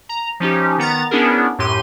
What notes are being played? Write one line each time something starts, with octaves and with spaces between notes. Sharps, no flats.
A#5
F3 C#4 D#4 G4
D#3 B3 A#5 A6
B3 C#4 D4 E4 G#4 A#4
F#2 A2 G4 C6 D#7